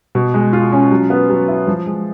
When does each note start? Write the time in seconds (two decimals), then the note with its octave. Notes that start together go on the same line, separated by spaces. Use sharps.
0.15 B2
0.34 G#3
0.53 F4
0.72 C#4
0.91 F#3
1.10 B3
1.30 F#3
1.48 E4
1.67 F3
1.86 G#3